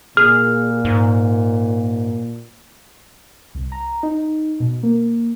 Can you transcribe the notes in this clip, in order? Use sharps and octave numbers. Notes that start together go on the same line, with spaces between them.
A#2 G#4 F6
G#2
C2
A#5
D#4
B2
A#3